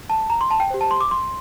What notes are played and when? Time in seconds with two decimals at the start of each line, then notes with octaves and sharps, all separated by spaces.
0.10 A5
0.30 A#5
0.41 C6
0.51 A5
0.60 G5
0.70 G4 C5
0.81 A5
0.91 C6
1.01 D6
1.11 C6